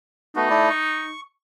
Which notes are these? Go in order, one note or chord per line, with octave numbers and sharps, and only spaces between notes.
A3 B3 D#4 F#4
A3 E4 D5
C#6